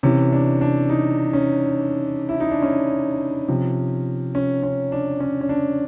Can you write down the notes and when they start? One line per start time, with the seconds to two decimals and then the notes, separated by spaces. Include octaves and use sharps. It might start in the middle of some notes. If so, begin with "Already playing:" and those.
0.03 C3 E3 C#4
0.32 D4
0.61 D4
0.89 D#4
1.33 C#4
2.29 E4
2.40 D#4
2.51 D4
2.62 C#4
3.48 C3 F3
4.35 C#4
4.63 C#4
4.92 D4
5.20 C#4
5.41 C#4
5.49 D4